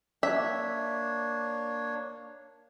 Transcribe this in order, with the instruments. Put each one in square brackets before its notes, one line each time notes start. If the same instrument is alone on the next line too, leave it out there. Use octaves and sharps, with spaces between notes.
[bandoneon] A#3 D4 C#5 [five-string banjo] E5